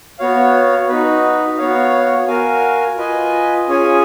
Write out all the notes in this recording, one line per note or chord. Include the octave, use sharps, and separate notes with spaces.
B3 F#4 C#5 F5
D#4 F#4 B4
B3 F#4 C#5 F5
F#4 A#4 F5 G#5
F4 B4 D#5 G#5
C#4 F4 G#4 C#5 G#5